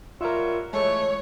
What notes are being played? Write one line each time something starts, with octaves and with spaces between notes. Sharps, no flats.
F#3 G3 F4 A#4 E5
E3 G#3 A3 C#5